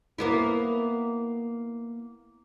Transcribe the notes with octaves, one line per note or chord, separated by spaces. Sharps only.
A#3 B3 E4